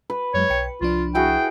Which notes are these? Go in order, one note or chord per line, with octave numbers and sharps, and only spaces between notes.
B4
F#2 F#3 G#3 C#5
B1 G5 C#7
C2 F3 D4 F4
E4 F#4 G#4 G5